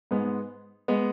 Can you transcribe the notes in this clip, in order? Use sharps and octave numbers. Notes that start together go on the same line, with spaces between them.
G#2 G#3 B3
G#3 B3